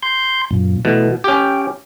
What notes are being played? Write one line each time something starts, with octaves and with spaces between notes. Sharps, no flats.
C6 G6
F#2 A#2
B2 E3 A3
C#4 G4 G5